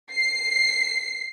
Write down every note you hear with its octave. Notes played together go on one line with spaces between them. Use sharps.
C7